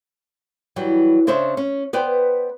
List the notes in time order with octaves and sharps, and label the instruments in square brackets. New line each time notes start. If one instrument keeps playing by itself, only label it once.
[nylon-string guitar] E3 F#3 G3
C#3 D4 C5 C#5 E5
C#4
B3 B4 C5 D5 G5